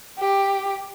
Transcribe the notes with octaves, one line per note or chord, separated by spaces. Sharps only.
G4